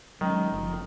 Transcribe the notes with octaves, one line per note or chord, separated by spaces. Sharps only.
D#3 F#3 G#3 C#4
F#1 F3